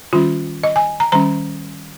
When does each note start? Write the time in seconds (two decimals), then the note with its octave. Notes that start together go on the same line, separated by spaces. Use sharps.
0.13 D#3 G3 C#4 F4
0.64 D#5
0.76 G#5
1.00 A#5
1.12 D#3 G3 C#4 A#5